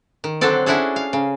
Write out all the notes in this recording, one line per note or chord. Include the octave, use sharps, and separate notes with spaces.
D#3
D3 F#3 C4 D4 A4 D5
C#4 D4 E4 F#4 G#4 A4
F5
C#3